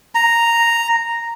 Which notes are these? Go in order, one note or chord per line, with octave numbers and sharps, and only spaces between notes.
A#5